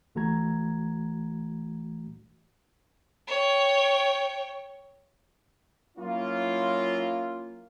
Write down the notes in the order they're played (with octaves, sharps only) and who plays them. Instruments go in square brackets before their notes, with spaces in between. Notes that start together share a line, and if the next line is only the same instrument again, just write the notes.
[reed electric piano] C#2 E3 A3 F#4 A#5 G#6
[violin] C#5 G5
[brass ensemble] F#3 A#3 C#4 E4 F4